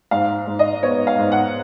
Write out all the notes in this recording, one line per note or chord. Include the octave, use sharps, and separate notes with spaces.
G#2 F5
G#2
D#5
B3 C#5
F5
G#2
F#5